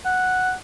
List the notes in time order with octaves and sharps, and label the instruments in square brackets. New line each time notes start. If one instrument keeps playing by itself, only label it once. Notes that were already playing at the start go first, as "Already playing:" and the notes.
[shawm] F#5